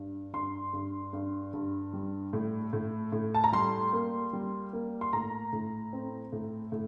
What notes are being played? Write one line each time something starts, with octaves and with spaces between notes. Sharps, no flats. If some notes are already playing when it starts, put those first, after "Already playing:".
Already playing: G2
G2 C6
G2
G2
G2
G3
A2
A2
A2
A5
A#5
G3 C6
A#3
G3
A#3
C6
A2 A#5
A2
C4
A2
A2